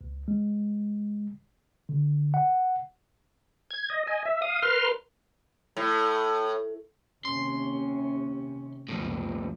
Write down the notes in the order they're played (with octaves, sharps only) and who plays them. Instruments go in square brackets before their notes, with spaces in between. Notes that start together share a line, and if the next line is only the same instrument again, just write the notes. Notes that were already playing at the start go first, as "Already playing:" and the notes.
[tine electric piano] C#2
G#3
D3
F#5
[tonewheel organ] G#6
D#5
D#5 G#5
E5
F5 D#6
A#4 B4 C6 F6
[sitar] A2
[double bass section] D#2 C3 C#4 [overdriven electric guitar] C6
[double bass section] C#2 F#2 [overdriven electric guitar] A2 F3